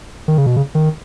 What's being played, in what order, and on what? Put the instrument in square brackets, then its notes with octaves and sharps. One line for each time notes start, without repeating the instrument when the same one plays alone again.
[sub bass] D#3
C#3
B2
C#3
D#3